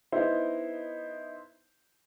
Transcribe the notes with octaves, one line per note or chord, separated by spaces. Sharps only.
B3 D#4 E4 C5